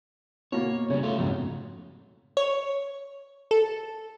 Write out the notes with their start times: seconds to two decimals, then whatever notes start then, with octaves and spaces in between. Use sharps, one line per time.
0.52 B2 A#3 C#5
0.90 C#3 G3 C#5
1.03 A3 F4
1.18 B1 F2 G#2 C#3
2.37 C#5
3.51 A4